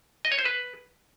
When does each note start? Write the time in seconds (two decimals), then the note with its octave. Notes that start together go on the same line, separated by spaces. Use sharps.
0.25 D#5
0.32 C#5
0.39 C5
0.45 B4